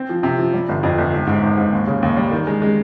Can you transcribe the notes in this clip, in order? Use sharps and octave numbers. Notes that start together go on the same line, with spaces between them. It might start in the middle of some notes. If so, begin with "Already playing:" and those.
Already playing: C4
F3
C3
F3
G3
G1
F2
G1
G#1
G#2
G#1
G#2
D#2
C#3
D#2
G3
D#3
G#3
G#3